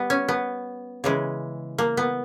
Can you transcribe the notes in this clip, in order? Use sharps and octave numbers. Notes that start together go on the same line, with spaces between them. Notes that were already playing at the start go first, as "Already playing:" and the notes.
Already playing: G3 B3
C#4
B3
C#3 E3 G#3
A#3
B3